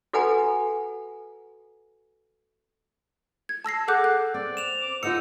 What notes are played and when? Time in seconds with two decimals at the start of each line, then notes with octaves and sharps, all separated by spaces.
0.13 F#4 A4 B4 F#5 G#5 A#5
3.49 G#6
3.64 A5 E6 A#6 C7
3.88 G#4 A4 F#5 D6 F#6 G6
4.04 F#6
4.34 C4 D5
4.57 E7 F7
4.81 D6
5.03 D#4 F4 A4 D#5 F#5 E6 C#7